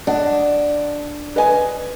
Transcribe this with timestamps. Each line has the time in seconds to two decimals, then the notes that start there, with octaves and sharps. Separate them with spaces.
0.07 D4 D#5 F#5
1.36 B4 D#5 G#5